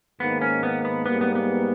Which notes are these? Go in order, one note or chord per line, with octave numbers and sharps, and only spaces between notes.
G#2 D#3 A#3 B3
C#4
B3
B3
G#2 G3 A#3 B3
B3
B3